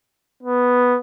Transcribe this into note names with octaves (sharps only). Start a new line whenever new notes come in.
B3